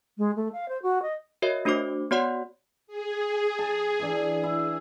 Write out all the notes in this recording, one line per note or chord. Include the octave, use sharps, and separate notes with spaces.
G#3
A3
F5
C5
F#4
D#5
F#4 A#4 C#5 D#5 E5
A3 D4 F#4 C5 D6
B3 F#4 C#5 D5 F#5 C6
G#4
A5
E3 D4
E4